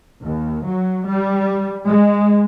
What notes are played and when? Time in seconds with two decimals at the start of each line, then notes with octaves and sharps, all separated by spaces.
0.19 D#2
0.65 F#3
1.08 G3
1.86 G#3